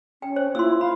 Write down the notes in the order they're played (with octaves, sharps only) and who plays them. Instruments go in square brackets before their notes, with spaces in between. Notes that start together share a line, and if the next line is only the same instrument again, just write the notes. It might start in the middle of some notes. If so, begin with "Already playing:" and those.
[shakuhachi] C#4 [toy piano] G5
[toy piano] C5
[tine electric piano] A#3 F4 [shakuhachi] E4 [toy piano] C6 E6
[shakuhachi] F5 [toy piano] B5